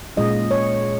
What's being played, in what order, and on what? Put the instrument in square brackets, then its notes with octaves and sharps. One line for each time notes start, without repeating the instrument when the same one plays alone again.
[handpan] A#2 G#3 C#4 F4 D#5
C#5